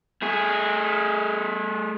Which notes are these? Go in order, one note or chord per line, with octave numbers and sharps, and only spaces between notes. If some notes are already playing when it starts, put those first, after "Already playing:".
A3 G#4